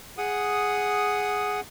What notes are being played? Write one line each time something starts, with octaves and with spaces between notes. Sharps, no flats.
G#4 F#5 D#6